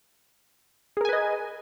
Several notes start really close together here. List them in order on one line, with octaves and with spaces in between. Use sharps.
G#4 A#4 G#5 B4 D#5